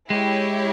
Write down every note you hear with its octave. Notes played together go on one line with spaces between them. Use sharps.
G#3 E4 G4 C#5